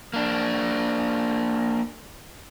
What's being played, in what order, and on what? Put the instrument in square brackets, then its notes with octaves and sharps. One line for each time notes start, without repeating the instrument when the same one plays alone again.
[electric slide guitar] A#3 D4